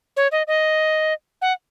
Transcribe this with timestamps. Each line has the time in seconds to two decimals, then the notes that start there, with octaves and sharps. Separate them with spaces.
0.17 C#5
0.32 D#5
0.47 D#5
1.42 F#5